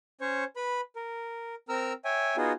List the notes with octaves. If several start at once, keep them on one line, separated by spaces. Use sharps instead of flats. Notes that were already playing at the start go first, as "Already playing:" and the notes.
C#4 C5 C#5 C#6
B4 B5
A#4
C4 A#4 A#5 E6 F6
C#5 E5 G5 G#5
B3 D#4 F4 F#4 G#4